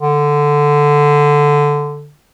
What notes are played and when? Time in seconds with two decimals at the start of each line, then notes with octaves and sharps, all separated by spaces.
0.01 D3